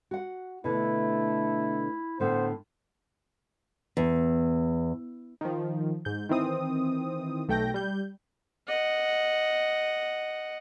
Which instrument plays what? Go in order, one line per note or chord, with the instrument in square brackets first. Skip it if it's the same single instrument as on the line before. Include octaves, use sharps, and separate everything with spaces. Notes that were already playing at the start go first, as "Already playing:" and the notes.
[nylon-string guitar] F#4 F#5
[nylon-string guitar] B2 D3 [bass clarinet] A3 [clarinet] E4
[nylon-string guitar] A2 D3 [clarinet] B3 [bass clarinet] C5
[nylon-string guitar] E2
[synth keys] D#3 F3
G#2 G6
D#3 E3 C4 D#6
B1 A3 G5 G6 A#6
G3 G6
[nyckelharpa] D#5 F#5